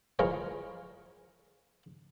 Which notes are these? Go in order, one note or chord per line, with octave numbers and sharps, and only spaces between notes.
E3 F3 G#3 A#4 C#5